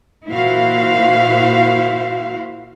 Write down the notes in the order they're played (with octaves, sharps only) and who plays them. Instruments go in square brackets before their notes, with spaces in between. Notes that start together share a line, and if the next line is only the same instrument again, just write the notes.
[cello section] A#2 E3 E4 F#4 C5 F5